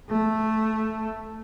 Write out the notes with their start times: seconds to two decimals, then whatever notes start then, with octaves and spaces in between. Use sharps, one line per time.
0.09 A3